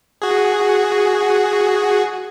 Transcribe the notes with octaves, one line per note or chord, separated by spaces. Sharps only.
F#4 G#4